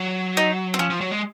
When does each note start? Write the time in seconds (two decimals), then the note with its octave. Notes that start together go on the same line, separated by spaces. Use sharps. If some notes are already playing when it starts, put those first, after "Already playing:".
Already playing: F#3
0.37 D#4
0.74 C4
0.79 F3 C#4
0.90 F3
1.01 F#3
1.11 G#3